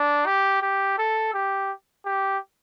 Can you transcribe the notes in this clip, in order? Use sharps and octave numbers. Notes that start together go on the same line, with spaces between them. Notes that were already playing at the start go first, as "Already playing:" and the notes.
Already playing: D4
G4
G4
A4
G4
G4